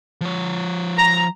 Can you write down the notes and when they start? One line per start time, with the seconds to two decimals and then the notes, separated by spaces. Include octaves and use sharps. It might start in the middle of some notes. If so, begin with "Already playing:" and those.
0.21 F3 C#5
0.98 A#5